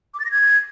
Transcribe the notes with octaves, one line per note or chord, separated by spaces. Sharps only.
D6
A6
A#6
G#6